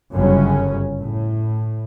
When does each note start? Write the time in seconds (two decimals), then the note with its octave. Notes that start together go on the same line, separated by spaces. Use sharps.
0.13 G1 F#2 C#3 C#4
1.00 A2